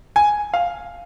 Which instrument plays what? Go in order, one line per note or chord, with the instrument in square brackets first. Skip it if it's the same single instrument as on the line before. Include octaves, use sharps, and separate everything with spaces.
[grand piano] G#5
F5